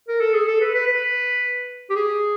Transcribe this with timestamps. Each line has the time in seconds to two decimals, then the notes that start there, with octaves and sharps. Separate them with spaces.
0.08 A#4
0.21 A4
0.34 G#4
0.47 A4
0.61 B4
0.74 B4
0.87 B4
1.90 G4
1.96 G#4